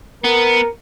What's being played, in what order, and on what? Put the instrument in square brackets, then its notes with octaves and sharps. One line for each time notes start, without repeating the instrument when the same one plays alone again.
[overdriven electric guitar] B3 [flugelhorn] A#4